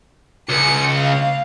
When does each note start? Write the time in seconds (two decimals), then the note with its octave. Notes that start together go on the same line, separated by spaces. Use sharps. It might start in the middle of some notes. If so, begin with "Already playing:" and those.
0.49 C#2 C#7
0.96 F5